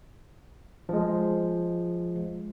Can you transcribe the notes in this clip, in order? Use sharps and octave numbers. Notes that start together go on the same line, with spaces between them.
F3 G#3